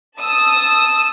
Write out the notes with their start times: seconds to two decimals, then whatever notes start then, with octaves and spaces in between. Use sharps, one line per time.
0.18 A5 D#6 E6